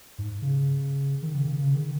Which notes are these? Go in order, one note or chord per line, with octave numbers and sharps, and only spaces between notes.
G#2
C#3
D#3
C#3
C#3
C#3
D#3